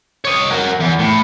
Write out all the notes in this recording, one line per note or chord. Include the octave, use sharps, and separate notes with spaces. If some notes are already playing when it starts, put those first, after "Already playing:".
C#5 D#5
F#4 A#4
E2
A2